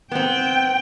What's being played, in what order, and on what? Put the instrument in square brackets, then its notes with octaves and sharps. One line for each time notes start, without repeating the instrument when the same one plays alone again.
[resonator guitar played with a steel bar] B3 C4 [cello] G5